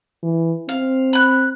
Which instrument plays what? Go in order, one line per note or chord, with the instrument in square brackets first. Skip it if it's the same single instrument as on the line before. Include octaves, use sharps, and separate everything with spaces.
[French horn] E3
[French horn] C4 [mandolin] F5
[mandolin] B5 F#6